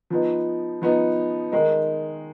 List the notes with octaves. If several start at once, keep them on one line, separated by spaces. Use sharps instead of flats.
F3 B3 D#4
F3 B3 D#4
D#3 G#3 D#4